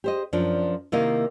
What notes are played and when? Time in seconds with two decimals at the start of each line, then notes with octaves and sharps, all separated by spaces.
0.04 G4 C5 D#5
0.33 F#2 F3 D4
0.92 C3 D#3 A#3 E4 D#5 F5